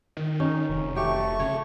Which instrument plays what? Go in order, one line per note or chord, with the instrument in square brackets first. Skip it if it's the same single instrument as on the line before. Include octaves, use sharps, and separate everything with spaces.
[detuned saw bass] D#3
[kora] C#4 D#4
[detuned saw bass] F1
[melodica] A3 C#6 [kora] G4
[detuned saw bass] C#3 [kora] C#5